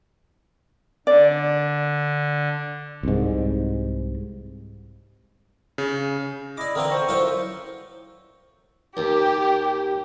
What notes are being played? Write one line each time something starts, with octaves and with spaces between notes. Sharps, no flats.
D3 D5
C2 G#2
C#3
E4 D5 D#5 D6
D3 E3 C4 F4 A#4
C5 C#6
F#2 E4 F4
D#2 G4